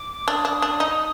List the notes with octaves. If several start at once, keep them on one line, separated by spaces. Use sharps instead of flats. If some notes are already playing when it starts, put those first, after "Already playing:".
Already playing: D6
D4 D#6
D4
D4
D#4